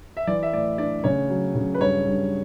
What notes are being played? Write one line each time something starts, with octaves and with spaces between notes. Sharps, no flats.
E5
E3 D5
E5
A2 D5
D4 D5
C#3 C#5
F#3
C#3
B4
G2 C#5
G2